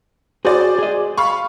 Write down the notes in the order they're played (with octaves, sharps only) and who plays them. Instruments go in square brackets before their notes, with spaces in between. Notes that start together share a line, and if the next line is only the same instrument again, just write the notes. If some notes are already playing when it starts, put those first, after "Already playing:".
[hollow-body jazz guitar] F#4 G#4 [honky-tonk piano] C5 D5
[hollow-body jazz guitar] G#4 D#5
[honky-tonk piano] F5 B5 C#6